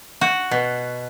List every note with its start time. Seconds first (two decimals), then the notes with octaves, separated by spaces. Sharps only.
0.21 F#4
0.51 B2